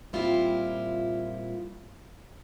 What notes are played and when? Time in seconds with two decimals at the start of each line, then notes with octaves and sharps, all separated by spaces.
0.13 A#2 G3 C4 E4 F4